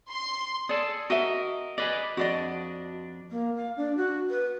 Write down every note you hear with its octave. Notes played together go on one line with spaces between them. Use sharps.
C6
G#4 A4 D5
F#4 A#4 D#5 E5
G#4 B4 D5 D#5
F2 D4 F#4 D5 D#5
A#3
F5
D4
F#4
B4